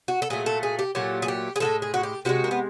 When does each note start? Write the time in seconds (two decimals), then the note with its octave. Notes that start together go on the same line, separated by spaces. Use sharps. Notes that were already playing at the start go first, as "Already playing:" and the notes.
0.08 F#4
0.22 A4
0.30 A#2 F#3 A3 G#4
0.46 A4
0.63 G#4
0.79 G4
0.95 A#2 F#3 A3 G4
1.22 G#4
1.28 G4
1.56 G#4
1.60 F3 G#3 A4
1.65 A2
1.82 G#4
1.94 F#4
2.03 G4
2.25 C3 D#3 G#3 F#4
2.44 A#3
2.51 B3